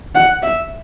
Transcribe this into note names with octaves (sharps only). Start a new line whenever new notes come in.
F#5
E5